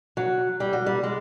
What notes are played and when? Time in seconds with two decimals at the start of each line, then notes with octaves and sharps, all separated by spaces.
0.17 F#3
0.60 G3
0.73 F#3
0.86 G3
1.03 G#3